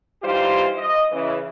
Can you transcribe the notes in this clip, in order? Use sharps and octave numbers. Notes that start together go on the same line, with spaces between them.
E3 G3 D#4 F4 G4 C5
D#5
C#3 E3